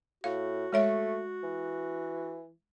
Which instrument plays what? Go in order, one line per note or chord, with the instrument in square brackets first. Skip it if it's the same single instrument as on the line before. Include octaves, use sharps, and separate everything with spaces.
[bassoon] A2 [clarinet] F#4 [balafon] F5
[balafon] G#3 C#5 E5 [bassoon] A3
[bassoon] E3